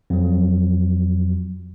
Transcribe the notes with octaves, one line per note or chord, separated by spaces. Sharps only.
F2 F#3